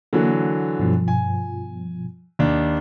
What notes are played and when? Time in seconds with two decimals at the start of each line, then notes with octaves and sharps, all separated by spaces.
0.13 D3 E3 F#3 A#3
0.79 G2 B2 F3
1.08 G#5
2.39 D#2 D4